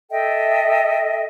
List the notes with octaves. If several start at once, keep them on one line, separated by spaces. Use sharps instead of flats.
A4 D#5 E5 G5